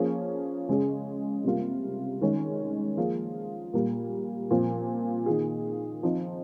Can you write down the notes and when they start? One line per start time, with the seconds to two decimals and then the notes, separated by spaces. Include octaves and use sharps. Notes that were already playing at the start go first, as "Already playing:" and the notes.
Already playing: F3 A#3 C#4 G#4
0.68 C#3 G#3 C#4 G#4
1.44 C3 G3 A#3 F4
2.21 D#3 G#3 C#4
2.97 F3 A#3 F4 G#4
3.73 A#2 G3 A#3
4.51 A#2 F3 C4
5.26 D#3 A#3 F4 G#4
6.03 F3 C4 D#4